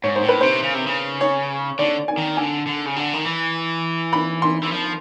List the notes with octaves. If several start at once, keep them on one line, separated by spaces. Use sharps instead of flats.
G#2 C#5
C5
A2
B4
C3 C5
C#3
C3
C#3
C#5
D3 D5
G#5
D#3
D3 G#5
D3
C#3
D3
D#3
E3
B5
C6
E3
F3